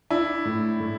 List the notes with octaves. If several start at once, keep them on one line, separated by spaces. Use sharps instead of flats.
D4 E4
A2
A2